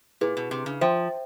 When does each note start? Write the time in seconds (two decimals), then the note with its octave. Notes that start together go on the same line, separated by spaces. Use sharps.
0.21 A#2 E4 G#4 B4
0.37 B2
0.51 C3
0.66 C#3
0.81 F3 C5 E5 G5